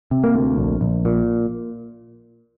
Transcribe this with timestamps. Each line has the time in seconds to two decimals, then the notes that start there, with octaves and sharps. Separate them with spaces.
0.11 C3
0.24 A#3
0.34 D2
0.58 A#1
0.81 A#1
1.05 A#2